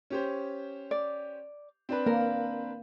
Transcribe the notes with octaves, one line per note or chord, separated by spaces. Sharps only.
C#4 G4 C5
D5
C4 D4 B4
A#3 A#4